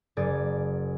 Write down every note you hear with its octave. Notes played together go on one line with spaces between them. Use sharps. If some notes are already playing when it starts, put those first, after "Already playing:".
F#1 G#4 D5